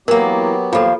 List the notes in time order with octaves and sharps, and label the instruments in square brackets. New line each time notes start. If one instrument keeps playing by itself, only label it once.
[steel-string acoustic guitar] E3 A#3 [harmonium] F#3 B3 G4 [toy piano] A#4
[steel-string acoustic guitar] D#2 F3 [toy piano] F4 A4 [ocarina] F5